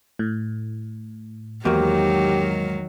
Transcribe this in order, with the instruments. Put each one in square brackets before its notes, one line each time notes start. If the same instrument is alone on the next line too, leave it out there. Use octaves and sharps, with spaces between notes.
[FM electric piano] A2
[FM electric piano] E2 [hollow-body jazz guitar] G#2 A#3 F#4 [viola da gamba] D#3 F#3 [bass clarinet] G4